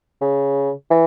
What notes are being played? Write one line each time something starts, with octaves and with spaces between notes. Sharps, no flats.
C#3
E3